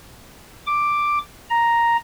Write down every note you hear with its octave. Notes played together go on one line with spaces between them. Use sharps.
D6
A#5